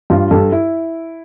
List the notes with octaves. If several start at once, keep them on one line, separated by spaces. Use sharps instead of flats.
G2 F4
G2 A4
E4